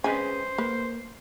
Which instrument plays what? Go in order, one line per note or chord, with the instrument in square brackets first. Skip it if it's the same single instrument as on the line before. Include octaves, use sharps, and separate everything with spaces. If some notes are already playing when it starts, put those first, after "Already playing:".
[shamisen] G#3 C4 G#5 [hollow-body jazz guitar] C#4 G#4 B4 [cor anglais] C5
[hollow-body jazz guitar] A#3 [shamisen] B4